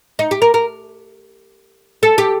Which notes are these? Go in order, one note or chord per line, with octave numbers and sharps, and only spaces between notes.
D#4
G4
A#4
A#4
A4
G4